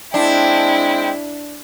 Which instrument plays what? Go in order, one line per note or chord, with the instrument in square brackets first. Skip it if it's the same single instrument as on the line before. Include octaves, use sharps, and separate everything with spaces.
[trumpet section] G#3 C4 G5 [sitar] D4 [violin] E4